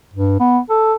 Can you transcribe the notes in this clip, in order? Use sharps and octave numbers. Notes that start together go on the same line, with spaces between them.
G2
B3
A4